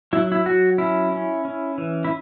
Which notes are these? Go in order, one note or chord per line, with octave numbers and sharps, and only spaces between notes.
F#3 E4
E4
F#3 F#4
C#4 E4
C#4
C#4
E3
E4